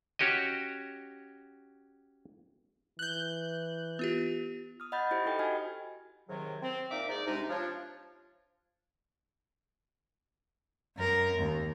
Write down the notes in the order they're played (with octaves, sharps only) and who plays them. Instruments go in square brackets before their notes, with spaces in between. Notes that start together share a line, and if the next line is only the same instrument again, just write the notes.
[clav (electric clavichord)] C#4 F#4 G4 C#5 D#5
[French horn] E3 [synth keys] F#6 G6
[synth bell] B3 F4 G4
[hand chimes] D#6 F6
D#5 F#5 B5 G6 A6
E4 G4 C5 D#5
D#4 A4 G5 B5
F#4 D#5 G#5 F6 G#6
[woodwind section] G#2 C3 D#3 F#3
C4
A#2 A#3 D#4 E5 D6
G#2 D#4 D5
C2 C3 G#3 D4 D#4
F3 D4 C#5
[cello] F#2 A#4
D#2